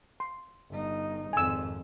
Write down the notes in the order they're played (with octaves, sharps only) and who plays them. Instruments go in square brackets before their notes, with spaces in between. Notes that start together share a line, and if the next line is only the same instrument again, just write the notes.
[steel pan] C6
[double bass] G1 D#4
[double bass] G#1 F2 [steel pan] G#5 E6